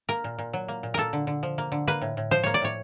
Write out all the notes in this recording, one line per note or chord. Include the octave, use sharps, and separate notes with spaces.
A#3 A#4
A#2
A#2
F#3
A#3
A#2
A#3 A4 A#4
D3
D3
F3
A#3
D3
A#3 B4
A2
A2
F3 C5
A#3 C#5
D5
A2 C#5